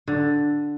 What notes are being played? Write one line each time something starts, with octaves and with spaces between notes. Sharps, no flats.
D3